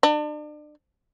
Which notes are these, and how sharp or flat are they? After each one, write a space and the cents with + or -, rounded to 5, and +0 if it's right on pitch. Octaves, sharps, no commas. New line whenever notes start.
D4 +35